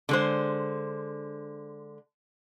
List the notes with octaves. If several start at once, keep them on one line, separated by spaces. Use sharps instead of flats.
D3 G#3 C5